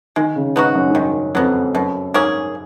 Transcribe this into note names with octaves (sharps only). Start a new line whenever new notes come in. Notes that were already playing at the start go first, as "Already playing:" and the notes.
D#3 G#3
C#3
G#2 B3 D#4 F#4
F#2
G#2
F#2 D#3
F2 F#3 B3
F#2 B2
G#2 A#3 C#4 G#4